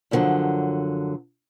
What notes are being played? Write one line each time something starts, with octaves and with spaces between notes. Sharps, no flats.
F#2 A#2 D3 D#3 F3 F#3